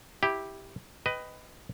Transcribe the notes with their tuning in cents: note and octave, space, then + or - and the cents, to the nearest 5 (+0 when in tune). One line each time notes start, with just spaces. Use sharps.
E4 -15 G4 +0
B4 +15 D#5 +0 G5 +0